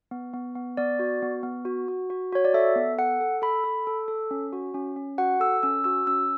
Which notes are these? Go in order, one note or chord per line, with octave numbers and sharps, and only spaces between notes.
B3
B3
B3
B3 D5
F#4
B3
B3
F#4
F#4
F#4
F#4 C#5
D5
A4 E5
B3
A4 F#5
A4
A4 B5
A4
A4
A4
C#4
F#4
C#4
C#4
F#4 F#5
A4 E6
C#4 E6
F#4 E6
C#4 E6